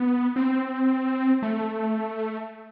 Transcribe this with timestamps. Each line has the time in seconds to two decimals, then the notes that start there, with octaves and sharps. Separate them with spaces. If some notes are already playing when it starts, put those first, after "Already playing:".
Already playing: B3
0.36 C4
1.42 A3